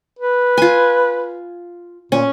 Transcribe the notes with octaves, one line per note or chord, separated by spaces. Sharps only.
B4
F4 G#5
A#2 C#4